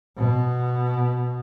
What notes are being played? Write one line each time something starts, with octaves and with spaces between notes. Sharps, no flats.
B2